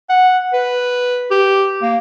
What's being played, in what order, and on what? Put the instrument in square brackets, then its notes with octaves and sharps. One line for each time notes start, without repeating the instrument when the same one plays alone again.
[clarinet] F#5
B4
G4
A#3